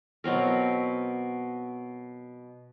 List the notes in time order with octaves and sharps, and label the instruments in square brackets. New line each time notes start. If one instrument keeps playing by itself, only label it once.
[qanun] B2 F#3 C4 A#4